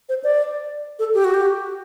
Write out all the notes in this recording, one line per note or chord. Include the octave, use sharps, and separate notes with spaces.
C5
D5
A4
G4
F#4
G4